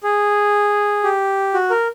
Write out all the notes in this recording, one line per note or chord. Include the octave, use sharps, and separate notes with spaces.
G#4
G4
F#4
A#4